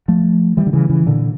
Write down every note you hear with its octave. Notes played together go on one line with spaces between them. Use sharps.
F3 A3
E3 G3
D3
C#3 E3
C#3 E3
A#2 D3